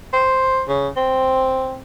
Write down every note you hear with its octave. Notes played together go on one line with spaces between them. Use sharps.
C5
C#3
C4